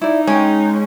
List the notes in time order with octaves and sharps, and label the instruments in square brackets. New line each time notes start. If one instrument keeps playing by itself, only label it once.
[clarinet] D#4 [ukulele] E4 D5
[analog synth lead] G#3 [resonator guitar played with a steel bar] C#4 [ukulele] C#5 G5